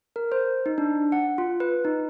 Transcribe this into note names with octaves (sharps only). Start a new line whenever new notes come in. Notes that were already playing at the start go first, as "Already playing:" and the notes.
A#4
C5
D#4
D4
F#5
F4
B4
D#4